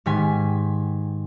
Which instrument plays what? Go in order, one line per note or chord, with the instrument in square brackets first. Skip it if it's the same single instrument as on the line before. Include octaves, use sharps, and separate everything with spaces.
[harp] G#2 D#3 G4 G#5 B6